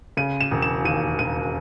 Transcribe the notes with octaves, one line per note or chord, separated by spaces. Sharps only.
C#3 D#7
E7
E1
E7
D#2 D#7
E1 D#7